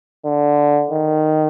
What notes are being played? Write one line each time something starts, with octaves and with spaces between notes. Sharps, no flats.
D3
D#3